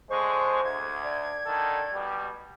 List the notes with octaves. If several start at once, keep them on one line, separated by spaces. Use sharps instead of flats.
D3 G#3 C5 C#6
D2 G#6
D5
D3 D#3 A4
B2 G3